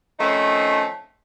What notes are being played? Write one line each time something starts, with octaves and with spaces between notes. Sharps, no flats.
D#3 F3 A3 C4 C#4 D#4